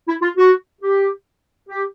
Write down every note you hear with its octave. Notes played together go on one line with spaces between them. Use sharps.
E4
F4
F#4
G4
G4